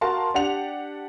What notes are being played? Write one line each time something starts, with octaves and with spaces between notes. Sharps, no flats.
F#4 A#4 F5 A5 C6
D4 G4 F#5 F7